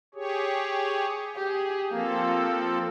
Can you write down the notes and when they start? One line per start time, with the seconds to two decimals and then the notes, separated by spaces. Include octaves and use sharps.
0.15 G4 G#4 C#5
1.36 G4 G#4
1.92 F3 A#3 C4 A4